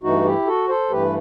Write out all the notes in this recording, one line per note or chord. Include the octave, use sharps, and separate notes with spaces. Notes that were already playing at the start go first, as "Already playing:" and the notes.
G2 E3 A3 D#4 F#4
E4 G4
F#4 A4
A4 C5
G2 E3 A3 G4 B4